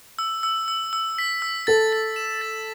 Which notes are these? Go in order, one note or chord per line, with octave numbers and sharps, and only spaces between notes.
E6
E6
E6
E6
B6
E6
A4 A6
A6
E7
A6